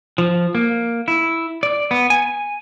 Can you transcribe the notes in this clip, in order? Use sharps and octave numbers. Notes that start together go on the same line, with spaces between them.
F3
A#3
E4
D5
B3
G#5